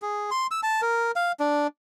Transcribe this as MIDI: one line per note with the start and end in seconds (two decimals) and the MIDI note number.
0.02 0.30 68
0.31 0.47 84
0.51 0.61 88
0.63 0.81 81
0.82 1.12 70
1.16 1.32 77
1.40 1.67 62